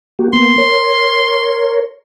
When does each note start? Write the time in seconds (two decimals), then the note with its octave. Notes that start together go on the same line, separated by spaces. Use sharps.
0.19 A#3 F#4 G4
0.33 A#3 B3 C6
0.58 A#4 C#5